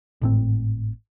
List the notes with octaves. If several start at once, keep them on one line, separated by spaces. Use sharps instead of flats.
G#1 A2 C4